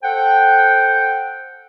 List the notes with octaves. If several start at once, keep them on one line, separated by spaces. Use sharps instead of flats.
A4 C5 F#5 G5